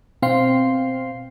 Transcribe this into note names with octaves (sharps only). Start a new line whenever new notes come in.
B2 C4 F5 G5 C6 C7